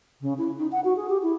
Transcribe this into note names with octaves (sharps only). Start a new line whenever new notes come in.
C#3
E4
D#4
F#5
F#4
G#4
G4
E4